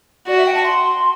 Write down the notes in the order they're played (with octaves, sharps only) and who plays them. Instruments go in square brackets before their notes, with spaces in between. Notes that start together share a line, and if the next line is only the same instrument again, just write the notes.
[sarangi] F#4 [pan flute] D5
[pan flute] E5
G5
A5
C6